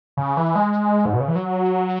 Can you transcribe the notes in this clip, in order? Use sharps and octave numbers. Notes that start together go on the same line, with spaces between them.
C#3
E3
G#3
G#2
B2
C#3
E3
F#3